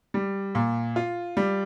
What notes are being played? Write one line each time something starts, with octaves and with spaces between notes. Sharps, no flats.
G3
A#2
F4
G3